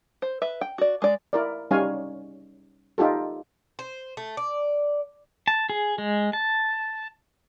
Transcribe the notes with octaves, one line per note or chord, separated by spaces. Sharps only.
C5
B4 E5
G5
F#4 D5
G#3 D5
E4 A#4 D5
G3 C#4 D#4 C#5 F5 G#5
D#4 F4 G4 A4
C5
A3
D5
A5
G#4
G#3
A5